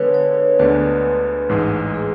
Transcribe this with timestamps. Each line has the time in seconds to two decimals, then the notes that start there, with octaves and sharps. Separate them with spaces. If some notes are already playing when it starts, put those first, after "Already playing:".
Already playing: D3 G#3 B3 B4 C#5
0.14 C#5
0.59 D2 D3 G#3 B3 D4 B4
1.49 A1 G#2 G#3
1.94 G#4